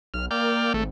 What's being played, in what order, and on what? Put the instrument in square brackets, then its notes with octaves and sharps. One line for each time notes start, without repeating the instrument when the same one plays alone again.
[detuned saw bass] B1 [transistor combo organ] F6
[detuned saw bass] A#3 [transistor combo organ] D5 G5 F6
[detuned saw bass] G#1 [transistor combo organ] A3